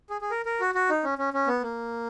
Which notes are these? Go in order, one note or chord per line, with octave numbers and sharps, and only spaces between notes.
G#4
G#4
A#4
A#4
F#4
F#4
D#4
C#4
C#4
C#4
B3
A#3